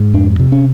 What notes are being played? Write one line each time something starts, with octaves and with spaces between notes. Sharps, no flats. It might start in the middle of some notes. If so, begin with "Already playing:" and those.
Already playing: G#2
F2 D4
C3
C#4